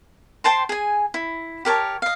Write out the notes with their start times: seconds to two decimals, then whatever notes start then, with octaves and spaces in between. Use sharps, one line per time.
0.44 C5 G5 A5 C6
0.69 G#4 G#5
1.14 E4
1.65 G4 A#4 C#5 A5
2.02 D#5 F5